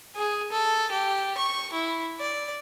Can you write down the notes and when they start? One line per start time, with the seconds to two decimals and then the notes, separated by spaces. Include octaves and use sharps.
0.16 G#4
0.52 A4
0.91 G4
1.38 C#6
1.73 E4
2.20 D5